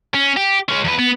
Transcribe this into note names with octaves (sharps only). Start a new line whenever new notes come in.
C#4
G4
G#3 C#4
E2 B4
B3